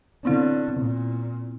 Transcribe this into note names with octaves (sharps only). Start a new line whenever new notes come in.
D3 B3 C4 E4
A#2